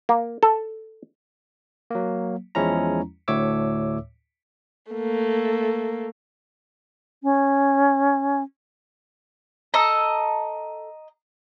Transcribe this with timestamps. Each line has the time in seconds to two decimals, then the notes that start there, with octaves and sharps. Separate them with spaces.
0.09 A#3
0.43 A4
1.91 F#3 A#3
2.55 E2 F3 G#3 C#4 E4 A#5
3.28 D2 A2 C#5 E5 D6 E6
4.92 A3 A#3
7.23 C#4
9.74 A4 D#5 A#5